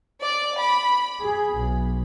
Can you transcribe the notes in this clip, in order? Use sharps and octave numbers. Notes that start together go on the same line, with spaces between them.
D5
B5
G#4
B1